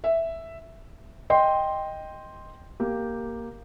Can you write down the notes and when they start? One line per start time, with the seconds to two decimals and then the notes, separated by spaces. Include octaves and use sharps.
0.04 E5
1.30 D#5 G5 C6
2.80 A#3 G4